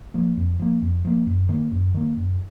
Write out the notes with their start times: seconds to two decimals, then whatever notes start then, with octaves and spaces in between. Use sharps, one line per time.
0.14 F3 A#3
0.37 F2
0.59 F3 A#3
0.82 F2
1.05 F3 A#3
1.27 F#2
1.49 D#3 A#3
1.72 F#2
1.94 D#3 A#3
2.17 F#2